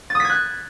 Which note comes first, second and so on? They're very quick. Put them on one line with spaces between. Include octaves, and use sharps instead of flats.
A6 D#6 B6 G#6 F#6